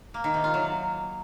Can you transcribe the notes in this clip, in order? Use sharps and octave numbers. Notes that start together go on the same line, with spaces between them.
A#3
D#3
C3
F4
F#3